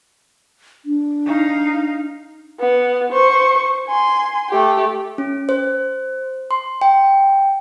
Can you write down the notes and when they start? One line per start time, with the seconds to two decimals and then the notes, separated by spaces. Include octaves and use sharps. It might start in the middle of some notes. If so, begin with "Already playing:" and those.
0.85 D4
1.26 D#4 F5
2.60 B3
3.13 C5 C#6
3.87 G#5 C6
4.50 A3 G4
5.18 C#4
5.49 C5
6.51 C6
6.82 G5